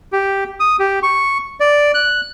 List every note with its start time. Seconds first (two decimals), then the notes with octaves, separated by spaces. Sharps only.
0.12 G4
0.60 D#6
0.79 G4
1.03 C#6
1.60 D5
1.94 F#6